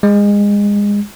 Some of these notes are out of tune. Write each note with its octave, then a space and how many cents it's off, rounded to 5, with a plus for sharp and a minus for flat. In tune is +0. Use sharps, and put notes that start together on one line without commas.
G#3 -25